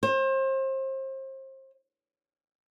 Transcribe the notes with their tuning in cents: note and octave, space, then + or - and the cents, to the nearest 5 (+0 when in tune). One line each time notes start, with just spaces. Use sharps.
C5 +35